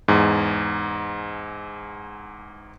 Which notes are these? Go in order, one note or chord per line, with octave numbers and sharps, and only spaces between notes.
E2 G#2